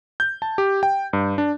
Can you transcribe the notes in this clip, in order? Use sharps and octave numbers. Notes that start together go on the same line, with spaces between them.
G6
A5
G4
G5
G2
D4